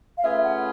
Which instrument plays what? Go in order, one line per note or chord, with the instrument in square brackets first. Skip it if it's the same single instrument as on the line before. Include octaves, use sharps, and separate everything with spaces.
[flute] F5
[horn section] A3 C#4 F4 G#4 B4 [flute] E5
[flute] F#5